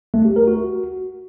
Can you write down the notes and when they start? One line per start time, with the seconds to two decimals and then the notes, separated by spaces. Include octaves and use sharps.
0.14 A3
0.25 G4
0.36 A#4
0.47 F#4